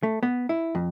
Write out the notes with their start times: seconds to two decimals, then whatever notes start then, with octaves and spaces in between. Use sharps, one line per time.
0.03 A3
0.23 B3
0.49 E4
0.75 F2